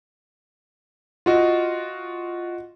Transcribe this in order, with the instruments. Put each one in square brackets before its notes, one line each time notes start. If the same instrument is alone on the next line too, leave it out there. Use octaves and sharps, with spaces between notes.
[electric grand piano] F4 F#4 D#5